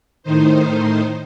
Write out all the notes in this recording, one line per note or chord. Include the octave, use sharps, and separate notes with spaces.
A2 D#3 D#4 C5